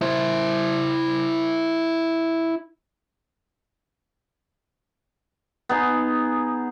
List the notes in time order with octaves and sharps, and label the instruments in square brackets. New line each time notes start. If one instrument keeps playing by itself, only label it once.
[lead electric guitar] E4 C5
[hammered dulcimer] B3 D#4 G#4